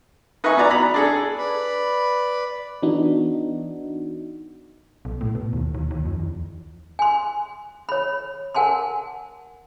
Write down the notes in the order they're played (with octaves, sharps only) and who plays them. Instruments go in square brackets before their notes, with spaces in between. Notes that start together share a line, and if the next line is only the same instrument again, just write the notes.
[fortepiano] D#4 B4 D#5 E5 G#5 C#6
B3 F#4 D5 A#5
A#5 B5
D4 G#4 A4
[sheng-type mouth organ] B4 D5 B5
[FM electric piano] E3 B3 D4 D#4 F#4
[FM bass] B1
A2
B2
D#2
D#2
D#2
F2
E2
[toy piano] G#5 C6
C#5 B5
A#4 F#5 G#5 A5 C6